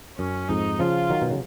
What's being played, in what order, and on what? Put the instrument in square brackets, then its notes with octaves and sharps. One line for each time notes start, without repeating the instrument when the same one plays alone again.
[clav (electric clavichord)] F#2 [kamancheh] C#4
[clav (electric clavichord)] F2 G#2 [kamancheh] D#4
[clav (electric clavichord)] C#3 F3 [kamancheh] F4
[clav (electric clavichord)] D#3 F#3
B2
C#3